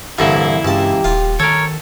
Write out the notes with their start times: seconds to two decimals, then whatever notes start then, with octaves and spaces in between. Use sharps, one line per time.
0.19 C2 G2 D3 E3 A#3 E4
0.65 C#2 G2 G4 A5
1.04 D#1 F4
1.40 D#3 A4 A#4 C#5